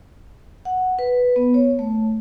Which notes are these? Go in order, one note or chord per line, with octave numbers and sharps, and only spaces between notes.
F#5
B4
B3
C#5
A3